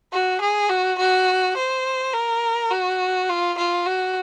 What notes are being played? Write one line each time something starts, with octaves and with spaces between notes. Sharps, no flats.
F#4
G#4
F#4
F#4
C5
A#4
F#4
F4
F4
F#4